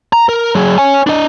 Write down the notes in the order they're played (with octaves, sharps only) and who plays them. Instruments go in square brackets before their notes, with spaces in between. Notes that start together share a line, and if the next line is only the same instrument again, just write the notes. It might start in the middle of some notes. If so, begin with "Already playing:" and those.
[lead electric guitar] A#5
A#4
F#3 G#4
C#5 G#5
D4 D#5